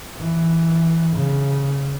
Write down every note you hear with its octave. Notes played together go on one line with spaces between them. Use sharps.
E3
C#3